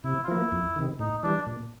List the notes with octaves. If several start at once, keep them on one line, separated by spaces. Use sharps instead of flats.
C3 E4
F4
F3 A#3 E4
F2
C3 D#3
A2 D#4
E3 G3 D4
A#2